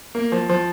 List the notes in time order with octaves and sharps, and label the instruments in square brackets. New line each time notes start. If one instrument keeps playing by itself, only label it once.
[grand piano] A#3
F3
F3